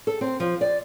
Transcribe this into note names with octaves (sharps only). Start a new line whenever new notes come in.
A4
C4
F3
D5